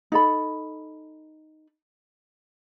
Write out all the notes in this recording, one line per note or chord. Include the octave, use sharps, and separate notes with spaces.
D#4 A4 B5